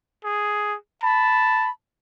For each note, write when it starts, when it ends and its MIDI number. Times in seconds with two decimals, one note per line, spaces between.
0.24 0.75 68
1.03 1.69 81
1.03 1.70 83